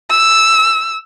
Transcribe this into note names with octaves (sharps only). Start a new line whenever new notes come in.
E6